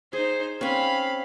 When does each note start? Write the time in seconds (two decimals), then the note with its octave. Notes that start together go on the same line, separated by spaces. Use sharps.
0.13 D#4 G#4 C5
0.61 C4 C#4 F5 B5